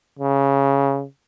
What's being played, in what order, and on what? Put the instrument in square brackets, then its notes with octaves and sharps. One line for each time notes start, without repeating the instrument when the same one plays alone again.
[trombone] C#3